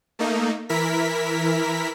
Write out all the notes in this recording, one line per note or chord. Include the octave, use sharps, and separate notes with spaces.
A3 A#3 D#4
E3 E4 A#4 B6